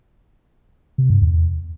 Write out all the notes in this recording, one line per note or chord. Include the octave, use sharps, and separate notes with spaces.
C3
G2
E2